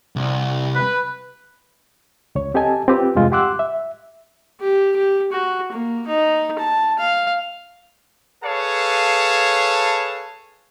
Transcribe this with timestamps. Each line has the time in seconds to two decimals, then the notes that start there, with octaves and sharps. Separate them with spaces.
0.16 C2
0.75 B4
2.35 C#2 C#5
2.54 C4 G4 A4 D#5 G#5 A5
2.88 C4 F4 G4 B4
3.15 E2 G2 C3 G#3 F4
3.32 G4 F#5 C6 D6 E6 F#6
3.59 E5
4.60 G4
4.96 G4
5.32 F#4
5.72 A#3
6.07 D#4
6.59 A5
6.99 F5
8.43 G#4 A4 B4 C#5 F5 A5